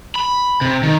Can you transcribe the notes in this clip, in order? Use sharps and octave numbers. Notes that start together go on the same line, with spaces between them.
B5
C3
D#3